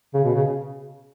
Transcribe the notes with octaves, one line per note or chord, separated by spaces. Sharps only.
C#3
B2
C#3